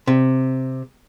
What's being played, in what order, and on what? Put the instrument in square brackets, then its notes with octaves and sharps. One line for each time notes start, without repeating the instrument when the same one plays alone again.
[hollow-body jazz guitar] C3